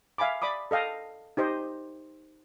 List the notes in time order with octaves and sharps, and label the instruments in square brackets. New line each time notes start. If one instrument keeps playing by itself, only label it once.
[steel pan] E5 F5 G#5 B5 D6
D5 B5 D6 D#6
A4 D#5 F5 G5
D#4 G4 C5 D#5